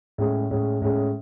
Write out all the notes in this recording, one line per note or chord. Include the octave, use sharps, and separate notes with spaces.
A2 G#3 C#4 G#4
A2 G#3 C#4 G#4
A2 G#3 C#4 G#4